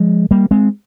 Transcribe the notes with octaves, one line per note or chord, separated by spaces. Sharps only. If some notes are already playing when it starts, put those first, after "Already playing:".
Already playing: F3 G#3
G3 A#3
G#3 C4